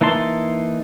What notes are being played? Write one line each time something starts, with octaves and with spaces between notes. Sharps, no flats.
E3 A#3 D#4 A5 C6